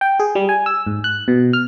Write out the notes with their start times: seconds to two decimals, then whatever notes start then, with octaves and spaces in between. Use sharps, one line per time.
0.01 G5
0.19 G#4
0.35 G3
0.49 G#5
0.66 E6
0.87 G#2
1.04 F#6
1.28 B2
1.53 F6